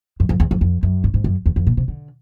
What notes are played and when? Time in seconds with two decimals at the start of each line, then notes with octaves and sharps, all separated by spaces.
0.20 F#2
0.29 F2
0.40 E2
0.51 F2
0.61 F2
0.83 F#2
1.04 G2
1.14 G#2
1.24 F#2
1.46 E2
1.56 F2
1.67 A#2
1.77 C3
1.88 D3